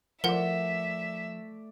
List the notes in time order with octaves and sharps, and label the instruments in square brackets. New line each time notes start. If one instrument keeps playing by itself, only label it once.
[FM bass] F3 [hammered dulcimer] A3 D5 [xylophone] A#4 F#5 [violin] E5